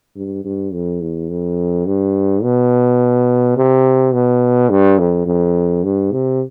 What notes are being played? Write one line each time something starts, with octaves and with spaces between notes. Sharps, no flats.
G2
G2
F2
E2
F2
G2
B2
C3
B2
G2
F2
F2
G2
C3